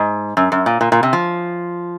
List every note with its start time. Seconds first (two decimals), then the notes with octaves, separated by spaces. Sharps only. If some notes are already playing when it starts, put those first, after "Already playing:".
Already playing: G#2
0.37 F#2
0.52 F#2
0.66 A#2
0.81 A#2
0.92 A#2
1.03 C3
1.13 F3